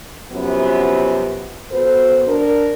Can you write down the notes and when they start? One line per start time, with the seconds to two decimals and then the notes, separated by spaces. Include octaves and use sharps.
0.32 F#2 C3 F3 F#3 B3 C#4
1.71 B3 F#4 A4 B4 C5
2.27 D4 A#4